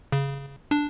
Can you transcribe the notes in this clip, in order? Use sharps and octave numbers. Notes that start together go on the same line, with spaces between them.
C#3
D4